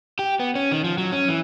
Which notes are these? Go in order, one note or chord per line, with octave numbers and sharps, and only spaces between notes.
G4
B3
C#4
D#3
F3
F#3
C#4
E3